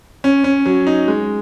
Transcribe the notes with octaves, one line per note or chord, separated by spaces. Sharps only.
C#4
C#4
F#3
D#4
G#3